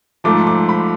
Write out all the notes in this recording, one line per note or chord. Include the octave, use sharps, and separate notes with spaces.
G#2 F3 A3 D6
D6
B5